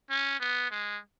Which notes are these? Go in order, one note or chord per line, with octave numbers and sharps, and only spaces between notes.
C#4
B3
G#3